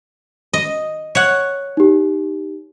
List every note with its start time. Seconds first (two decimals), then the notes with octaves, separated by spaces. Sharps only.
0.53 D#5
1.15 C#5 F#5
1.77 D#4 G4